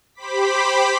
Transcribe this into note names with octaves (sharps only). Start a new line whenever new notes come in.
G4 C5 B5 D6 B6